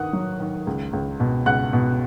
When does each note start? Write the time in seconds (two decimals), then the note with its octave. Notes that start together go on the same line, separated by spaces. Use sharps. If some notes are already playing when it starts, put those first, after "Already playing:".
Already playing: D#3 A#3 F#5 D#6 F#6
0.13 F#3
0.40 D#3
0.67 C#2
0.93 C#2
1.20 B2
1.46 C#2 F#5 F#6
1.73 B2